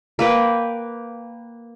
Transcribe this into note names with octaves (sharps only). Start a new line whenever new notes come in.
A#3 B4 G5